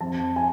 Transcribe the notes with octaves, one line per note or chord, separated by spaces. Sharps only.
F2 A5
G#5